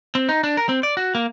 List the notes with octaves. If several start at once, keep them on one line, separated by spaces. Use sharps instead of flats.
C4
D#4
D4
A#4
C4
D5
F#4
A#3